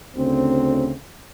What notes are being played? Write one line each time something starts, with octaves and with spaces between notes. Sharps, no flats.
D2 C#3 C4